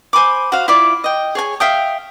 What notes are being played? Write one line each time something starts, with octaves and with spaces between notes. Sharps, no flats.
C5 G#5 B5 D6
F#4 C5 F5
E4 F4 D5
D#5 G5
G#4 C#5 G#5
E5 F5 G5 D#6